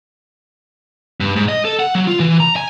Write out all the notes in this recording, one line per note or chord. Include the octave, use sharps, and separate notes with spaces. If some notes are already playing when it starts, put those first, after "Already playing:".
G2
G#2
D#5
A4
F#5
F#3
F4
E3
A#5
G#5